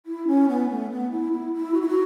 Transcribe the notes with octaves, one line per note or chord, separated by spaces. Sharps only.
E4
C#4
B3
A3
B3
E4
E4
E4
F#4
E4
F#4